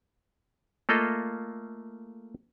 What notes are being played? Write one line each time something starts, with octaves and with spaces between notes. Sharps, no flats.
A3 A#3 F4 A4 D#5